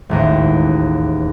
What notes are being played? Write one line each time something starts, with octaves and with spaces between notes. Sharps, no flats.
E1 A1 D#2